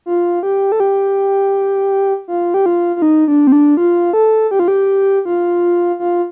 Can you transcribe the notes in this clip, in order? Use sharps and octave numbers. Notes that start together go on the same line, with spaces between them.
F4
G4
A4
G4
F4
G4
F4
F4
D#4
D4
C4
D4
F4
A4
G4
F4
G4
F4
F4